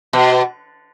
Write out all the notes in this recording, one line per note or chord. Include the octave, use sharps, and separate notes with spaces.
B2